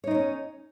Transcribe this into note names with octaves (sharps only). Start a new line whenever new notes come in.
C4 C#4 D#4 C#5